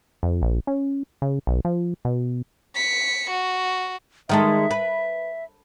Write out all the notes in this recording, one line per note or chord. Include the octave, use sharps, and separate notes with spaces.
F2
A#1
C#4
C#3
B1
F3
B2
B6 C#7
F#4
D#3 G#3 A4 E5
B4